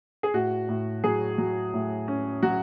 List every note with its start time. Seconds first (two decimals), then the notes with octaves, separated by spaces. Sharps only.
0.23 G#4
0.34 A2 F#4
0.69 A2
1.04 F#3 G#4
1.38 F#3
1.73 A2
2.08 C#4
2.43 F#3 F#4